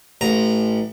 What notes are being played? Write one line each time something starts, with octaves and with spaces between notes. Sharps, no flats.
A1 A#5